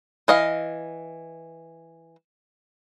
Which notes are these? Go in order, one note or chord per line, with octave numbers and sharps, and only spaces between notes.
E3 D#5 F5